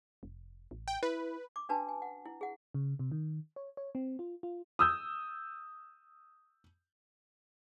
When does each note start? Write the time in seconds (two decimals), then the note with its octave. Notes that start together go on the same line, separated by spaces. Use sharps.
0.23 F1
0.71 A1
0.88 G5
1.03 E4 B4
1.56 D6
1.69 C#4 D4 F#4 B4 G#5 A5
1.89 G#5
2.02 F#5
2.26 E4
2.41 G#4 F#5
2.74 C#3
2.99 C3
3.12 D#3
3.56 C#5
3.77 C#5
3.95 C4
4.19 F4
4.43 F4
4.79 D#6 E6 G6